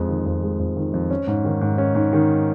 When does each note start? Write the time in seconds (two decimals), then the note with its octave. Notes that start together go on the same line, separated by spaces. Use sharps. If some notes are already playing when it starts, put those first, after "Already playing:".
Already playing: F2 G#3
0.09 D#3
0.26 F2
0.42 G#3
0.60 F2
0.77 D#3
0.94 F2
1.10 C#4
1.27 G#2
1.45 D#3
1.61 G#2
1.78 C#4
1.95 G#2
2.13 D#3